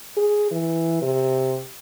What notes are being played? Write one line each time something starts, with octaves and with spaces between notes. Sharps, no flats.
G#4
E3
C3